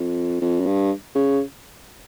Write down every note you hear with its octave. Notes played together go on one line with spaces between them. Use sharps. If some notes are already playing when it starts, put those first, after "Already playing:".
Already playing: F2
F2
F#2
G2
C#3